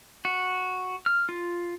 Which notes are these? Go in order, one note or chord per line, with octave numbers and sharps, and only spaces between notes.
F#4
F6
F4